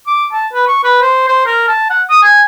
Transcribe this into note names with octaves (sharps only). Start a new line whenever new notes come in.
D6
A5
B4
C#6
B4
C5
C5
A#4
A5
F#5
D#6
G#5